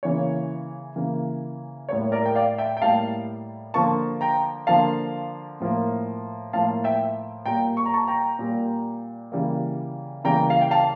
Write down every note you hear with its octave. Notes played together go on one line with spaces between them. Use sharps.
C#3 E3 A#3 C#5
C#3 E3 A#3
A2 G3 A#3 C#5
A#4 D5
G5
D5 F5
E5 G5
G5
A2 G3 A#3 F5 A5
D3 F3 A#3 A5 C#6
G5 A#5
D3 F3 A#3 F5 A5
A2 F3 A#3
A2 F3 A#3 F5 A5
E5 G5
A#2 G3 A#3 G5 A#5
C#6
A#5
A5 C#6
G5 A#5
A#2 G3 A#3
C#3 E3 G3 A#3
C#3 E3 G3 A#3 G5 A#5
F5
G5
F5 A5